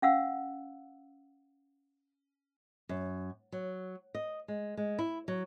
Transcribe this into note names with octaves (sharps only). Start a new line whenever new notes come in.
C#4 F5 F#5 E6
F#2
F#3
D#5
G#3
G#3
E4
F#3